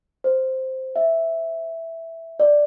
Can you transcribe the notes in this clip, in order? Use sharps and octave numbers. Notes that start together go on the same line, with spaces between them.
C5
E5
D5